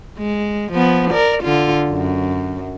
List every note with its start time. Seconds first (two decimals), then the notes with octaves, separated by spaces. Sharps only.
0.18 G#3
0.72 F3 B3
1.10 A#4 D5
1.43 D3 F4
1.90 F#2